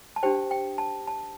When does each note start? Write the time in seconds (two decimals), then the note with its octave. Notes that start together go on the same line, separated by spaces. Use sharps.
0.16 A5
0.23 D4 G4 C5 G5
0.51 G5
0.78 A5
1.08 A5